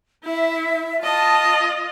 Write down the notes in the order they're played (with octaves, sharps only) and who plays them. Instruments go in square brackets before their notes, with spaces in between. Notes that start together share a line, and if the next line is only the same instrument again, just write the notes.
[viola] E4 [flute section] E5
[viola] F4 D#5 [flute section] A5